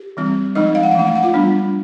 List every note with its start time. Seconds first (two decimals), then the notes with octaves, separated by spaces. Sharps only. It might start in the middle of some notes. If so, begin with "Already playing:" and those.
Already playing: G4
0.17 E3 G3 C4
0.55 F3 G#3 C#4 D#4 D#5
0.75 F5
0.83 F#5
0.91 F5
0.95 E3 A3 C#4 F#5
1.07 F5
1.15 F#5
1.23 F4 F5
1.34 G3 B3 D4